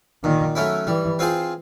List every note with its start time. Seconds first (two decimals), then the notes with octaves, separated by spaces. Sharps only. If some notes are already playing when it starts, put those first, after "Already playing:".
0.23 A#2 D#3
0.55 F#3 A3 C#4 E4
0.87 E3 G3
1.19 C4 F4 G#4 C5